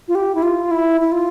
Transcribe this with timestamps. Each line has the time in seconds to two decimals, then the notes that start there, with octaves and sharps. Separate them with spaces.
0.08 F4
0.15 G4
0.35 E4
0.42 F4
0.71 E4
1.01 E4
1.12 F4